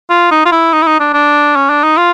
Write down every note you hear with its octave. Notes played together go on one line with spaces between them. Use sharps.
F4
D#4
F4
E4
D#4
E4
D#4
D4
D4
C#4
D4
D#4
F4